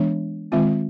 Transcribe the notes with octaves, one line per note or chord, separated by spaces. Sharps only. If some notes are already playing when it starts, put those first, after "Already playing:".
Already playing: E3 G#3 B3 D4
D#3 G#3 C4 F4